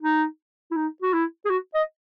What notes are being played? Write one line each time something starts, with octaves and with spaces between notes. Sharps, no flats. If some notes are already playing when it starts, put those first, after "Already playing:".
D#4
E4
D#4
F#4
E4
G#4
F#4
D#5